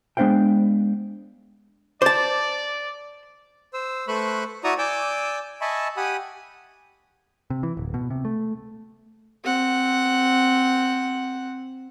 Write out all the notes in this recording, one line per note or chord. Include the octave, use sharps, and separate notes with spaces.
G#3 B3 D4 C5 F5 G5
C5 D5 A5 D6 A6
C5 E6
A3 B4 C5 B5 C#6 F#6
E4 F#4 D5 A#5 C#6 D#6
D5 G#5 D6 E6 G6
D#5 E5 G#5 A5 B5 C#6
G4 F#5 G#5 B5 D#6
C3
E3
D1
B2
C3
A3
C4 F#5